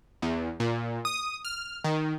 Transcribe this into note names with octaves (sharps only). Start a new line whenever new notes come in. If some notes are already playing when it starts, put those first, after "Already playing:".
E2
A#2
D#6
F6
D#3